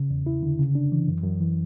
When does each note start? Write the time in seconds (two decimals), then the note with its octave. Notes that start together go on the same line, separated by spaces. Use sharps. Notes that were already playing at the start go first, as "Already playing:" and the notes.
Already playing: C#3
0.10 E2
0.26 E4
0.43 D3
0.59 C#3
0.75 D4
0.92 E3
1.08 F#2
1.24 F#2
1.41 E3